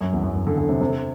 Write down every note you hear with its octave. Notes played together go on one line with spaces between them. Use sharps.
F#2
E2
F#2
F#2
D3
D3
C3
C3